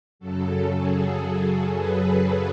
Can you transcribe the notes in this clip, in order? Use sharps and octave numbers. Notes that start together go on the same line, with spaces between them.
F#2 C#3 F#3 A4
G#4
B4